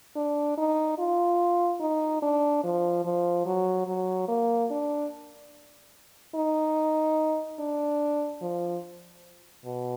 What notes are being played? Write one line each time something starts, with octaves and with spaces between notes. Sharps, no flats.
D4
D#4
F4
D#4
D4
F3
F3
F#3
F#3
A#3
D4
D#4
D4
F3
B2